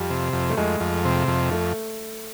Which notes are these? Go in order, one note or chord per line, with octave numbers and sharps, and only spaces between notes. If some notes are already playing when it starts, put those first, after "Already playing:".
Already playing: F2 G3
C3
F2
A3
F2 G#3
F2
C3
F2
A3